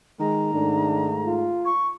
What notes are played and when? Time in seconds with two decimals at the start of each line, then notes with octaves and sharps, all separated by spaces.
0.20 D#3 G#3 A#5
0.53 G#2 A3 D4
1.26 F4
1.65 C#6